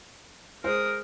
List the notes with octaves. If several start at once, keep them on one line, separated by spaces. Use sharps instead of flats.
G#3 A#4 C5 D#6